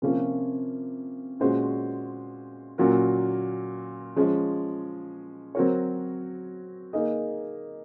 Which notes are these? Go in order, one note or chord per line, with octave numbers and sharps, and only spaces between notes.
C3 F3 A#3 C#4 F4
A#2 G#3 C#4 F#4 C5
A#2 F#3 C#4 F#4 A#4
F3 G#3 C#4
F#3 C4 F#4 A#4 C#5
A#3 D#4 G#4 D#5